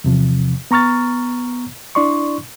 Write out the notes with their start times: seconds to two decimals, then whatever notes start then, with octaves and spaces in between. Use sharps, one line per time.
0.04 E2 C3 F3
0.71 B3 A#5 C#6 F6 A6
1.95 D4 E4 D5 C6 C#6